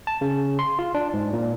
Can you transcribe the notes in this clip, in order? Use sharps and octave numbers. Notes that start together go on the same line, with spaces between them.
A5
C#3
C6
F4
D4
G#2
A#2